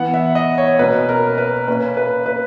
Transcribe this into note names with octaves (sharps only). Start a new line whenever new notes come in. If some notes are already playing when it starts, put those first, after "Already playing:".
Already playing: E3 B3 F#5
E5
D#5
C#5
B2 A#3 C#4 B4
A#4
B4
A#2 A#3 C#4 B4
B4
B4